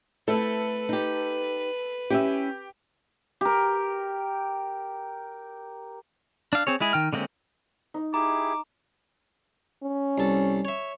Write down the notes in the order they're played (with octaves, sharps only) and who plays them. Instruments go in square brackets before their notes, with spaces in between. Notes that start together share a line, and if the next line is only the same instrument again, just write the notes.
[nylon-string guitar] A3 C4 E4 [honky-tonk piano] A4 [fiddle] B4
[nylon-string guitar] D#4 G4
[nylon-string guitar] C#4 E4 E5 [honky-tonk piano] G4
[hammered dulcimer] G4 A#4
[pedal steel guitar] D4 F5
C4 G#4 C#5
G#3 E4 G#4
D#3 G5 F6
D3 G#3 A#3 C4 C#4
[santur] D#4
[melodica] E4 G4 G#4 [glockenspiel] A#5 [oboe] D6
[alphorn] C#4
[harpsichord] C2 A4
C#5 E5